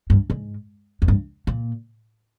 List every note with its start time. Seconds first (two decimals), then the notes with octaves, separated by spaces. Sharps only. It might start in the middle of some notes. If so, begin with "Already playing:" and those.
0.10 G2
0.30 G#2
1.02 F2
1.08 G2
1.47 A#2